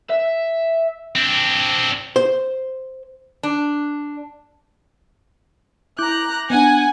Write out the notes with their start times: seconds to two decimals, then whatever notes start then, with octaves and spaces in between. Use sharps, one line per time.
0.10 E5
1.16 C4 D4
2.16 C5
3.43 D4
5.99 E4 A#5 D6 F#6 G6
6.50 B3 D4 F#5 G#5